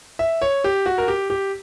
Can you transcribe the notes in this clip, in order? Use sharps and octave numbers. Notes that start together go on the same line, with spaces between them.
E5
C#5
G4
F#4
A#4
G4
G4